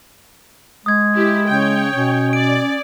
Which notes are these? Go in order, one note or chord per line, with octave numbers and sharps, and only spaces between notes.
G#3 D#6 G#6
E4 G4
C#3 C#5 G5
B2 C#4
D5 D7